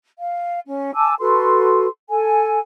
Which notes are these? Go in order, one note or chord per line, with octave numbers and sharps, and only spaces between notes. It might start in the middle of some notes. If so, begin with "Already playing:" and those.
F5
C#4
G#5 A5 D6 E6
F#4 A4 B4 C6
A4 G#5